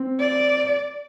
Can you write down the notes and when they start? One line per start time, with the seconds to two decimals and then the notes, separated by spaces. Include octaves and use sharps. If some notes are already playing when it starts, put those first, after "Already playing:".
Already playing: C4
0.20 D5